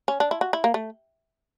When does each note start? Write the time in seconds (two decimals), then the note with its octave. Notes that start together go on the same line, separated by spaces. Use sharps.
0.08 C#4
0.20 D4
0.31 E4
0.41 F#4
0.53 E4
0.64 A#3
0.74 A3